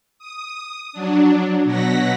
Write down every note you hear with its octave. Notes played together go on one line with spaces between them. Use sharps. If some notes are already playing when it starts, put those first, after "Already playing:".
D#6
F#3 D4
B2 F#3 F#5 A#6 B6